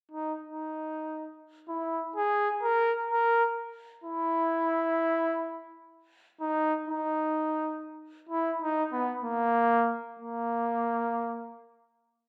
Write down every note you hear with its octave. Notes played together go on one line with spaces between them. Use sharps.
D#4
D#4
E4
G#4
A#4
A#4
E4
D#4
D#4
E4
D#4
B3
A#3
A#3